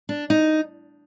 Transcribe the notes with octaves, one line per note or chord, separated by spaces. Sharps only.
D4
D#4